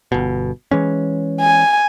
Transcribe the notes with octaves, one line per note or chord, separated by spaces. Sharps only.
G1 B2
E3 G#3 C#4
G#5